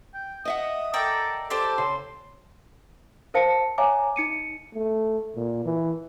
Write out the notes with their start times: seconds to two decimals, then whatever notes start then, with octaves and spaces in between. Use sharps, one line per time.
0.14 G5
0.45 D#5 E5 F#5 D#6
0.94 A4 A#4 D5 G5
1.50 G4 A4 C5 D5
1.78 C#3 C6
3.34 A#4 C5 F5 A5 C#7
3.78 C#5 E5 F5 G#5 A#5 D6
4.16 D#4 C#7 D#7
4.74 A3
5.35 A#2
5.65 E3